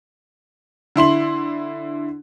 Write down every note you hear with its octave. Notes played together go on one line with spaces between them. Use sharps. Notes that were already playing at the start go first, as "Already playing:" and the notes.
D3 E4 C6 F#7